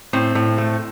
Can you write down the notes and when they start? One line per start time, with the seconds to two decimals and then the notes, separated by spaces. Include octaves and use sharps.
0.13 A2 C4
0.35 A2
0.58 A3